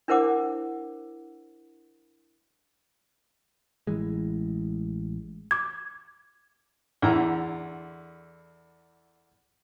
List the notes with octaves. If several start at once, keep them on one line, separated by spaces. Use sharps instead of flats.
D4 E4 A#4 C5 F#5 D6
A1 E3 G#3
D6 G#6
E2 D3 E4 A#5